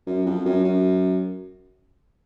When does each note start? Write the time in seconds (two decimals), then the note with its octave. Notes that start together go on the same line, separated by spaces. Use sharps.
0.06 F#2
0.26 F2
0.45 F#2
0.64 F#2